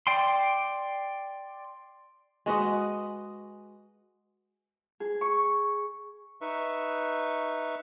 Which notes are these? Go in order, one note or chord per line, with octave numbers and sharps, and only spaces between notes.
D5 G5 C6
G#3 F#4 B4 D#5
G#4
C#6
D#4 B4 E5 C#6